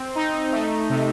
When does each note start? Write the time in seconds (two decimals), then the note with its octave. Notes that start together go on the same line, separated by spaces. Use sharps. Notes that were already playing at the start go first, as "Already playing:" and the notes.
Already playing: C4
0.15 D#4
0.52 A3
0.90 C3